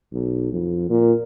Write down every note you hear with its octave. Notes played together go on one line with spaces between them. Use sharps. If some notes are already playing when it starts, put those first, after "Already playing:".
B1
F2
A#2